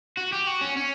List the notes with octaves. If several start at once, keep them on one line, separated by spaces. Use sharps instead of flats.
F#4
G4
F#4
C#4
C#4